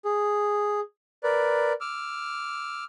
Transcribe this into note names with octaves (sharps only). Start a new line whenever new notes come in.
G#4
A#4 B4 D5
D6 E6 F6